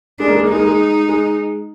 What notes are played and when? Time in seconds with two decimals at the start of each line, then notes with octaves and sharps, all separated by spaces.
0.19 G#3 D4
0.28 A#3
0.35 G#3
0.43 A#3
0.49 G#3 D#4
0.59 A#3
0.67 G#3
1.09 G#3